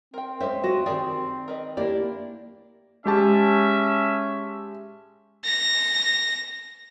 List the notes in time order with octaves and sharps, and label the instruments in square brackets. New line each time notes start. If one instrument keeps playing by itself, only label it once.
[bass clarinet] C4 [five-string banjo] A#4 G5
[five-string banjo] G#3 C#4 [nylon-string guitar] C5 E5
[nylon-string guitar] F#4 D#5 [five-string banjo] A5
[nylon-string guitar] D#3 D5 [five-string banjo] G4 G#4 A#4
[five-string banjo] A#4 B4 D#5
[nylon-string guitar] A#3 E4 G4 [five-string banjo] D4 D5
[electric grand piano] G#3 G4 A5 [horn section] C#4 E5
[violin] A#6